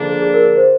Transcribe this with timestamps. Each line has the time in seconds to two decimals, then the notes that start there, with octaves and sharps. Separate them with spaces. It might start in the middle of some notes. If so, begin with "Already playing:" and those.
Already playing: D3 F3 A#3 D4 G#4
0.22 G#4
0.34 A#4
0.57 C5